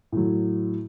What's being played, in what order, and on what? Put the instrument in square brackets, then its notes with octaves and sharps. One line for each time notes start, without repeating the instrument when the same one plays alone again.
[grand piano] A2 F#3